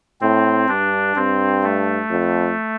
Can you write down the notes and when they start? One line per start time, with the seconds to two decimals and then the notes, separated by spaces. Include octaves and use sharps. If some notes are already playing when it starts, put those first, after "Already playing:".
0.21 A2 C4
0.68 G2 D4
1.16 G2 C4
1.63 A3
2.10 F2